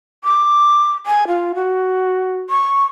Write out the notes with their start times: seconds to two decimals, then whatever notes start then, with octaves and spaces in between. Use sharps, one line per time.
0.24 D6
1.06 G#5
1.28 F4
1.55 F#4
2.50 C#6